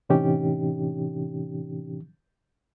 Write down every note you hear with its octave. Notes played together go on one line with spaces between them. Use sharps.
A2 C3 E3 C#4 D#4 G4